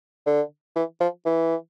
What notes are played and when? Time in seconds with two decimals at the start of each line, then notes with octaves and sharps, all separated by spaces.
0.26 D3
0.76 E3
1.00 F3
1.25 E3